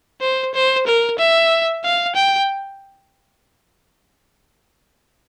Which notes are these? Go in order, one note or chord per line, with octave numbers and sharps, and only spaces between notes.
C5
C5
A#4
E5
F5
G5